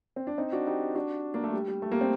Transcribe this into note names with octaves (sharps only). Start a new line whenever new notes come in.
C4
D4
C4 D#4
D4 F#4
D#4 G4
D4 F#4
A#3 D4
A3
G3
G3
A3
G3 A#3
C4